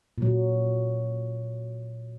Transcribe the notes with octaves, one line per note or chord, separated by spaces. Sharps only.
A#2 F#3